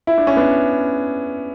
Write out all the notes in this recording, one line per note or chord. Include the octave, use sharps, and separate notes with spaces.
E4
D4
C#4
B3 D4